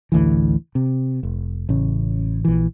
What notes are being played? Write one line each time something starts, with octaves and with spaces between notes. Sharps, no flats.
A1 D2 E3
C3
F1
A1 C#3
A#1 E3